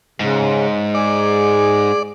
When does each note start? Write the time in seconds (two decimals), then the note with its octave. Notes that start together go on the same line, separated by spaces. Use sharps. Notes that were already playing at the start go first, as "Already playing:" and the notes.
0.20 G#2 C#3
0.95 G#4 D5